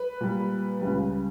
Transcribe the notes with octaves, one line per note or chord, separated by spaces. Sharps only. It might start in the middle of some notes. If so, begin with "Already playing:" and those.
Already playing: B4
A#2 G3
C#2 C#3 G3